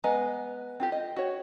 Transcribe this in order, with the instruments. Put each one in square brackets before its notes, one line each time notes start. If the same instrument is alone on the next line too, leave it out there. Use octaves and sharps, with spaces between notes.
[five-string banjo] G#3 B3 D#5 A#5
C4 F4 G4
D#5
F#4 C#5